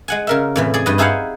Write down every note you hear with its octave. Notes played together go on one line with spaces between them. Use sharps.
G#3 F#5 G#5
C#3 A#4 E5
F2 A2 E3
G#4 D5
G2 B4 D#5
D#4 E4 G#4 C5 F5 F#5